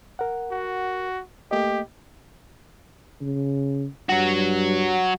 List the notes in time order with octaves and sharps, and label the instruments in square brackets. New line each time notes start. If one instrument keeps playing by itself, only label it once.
[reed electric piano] A#4 F#5
[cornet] F#4
[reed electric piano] A3 A#3 D#5 [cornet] G4
[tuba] C#3
[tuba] G2 [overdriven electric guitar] F#3 F#4